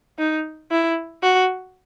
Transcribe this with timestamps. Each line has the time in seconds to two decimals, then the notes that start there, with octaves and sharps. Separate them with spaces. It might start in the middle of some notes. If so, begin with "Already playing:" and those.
0.19 D#4
0.71 E4
1.23 F#4